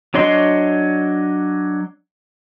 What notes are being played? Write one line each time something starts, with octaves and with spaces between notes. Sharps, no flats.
F#3 D4 C#5 D#5 C6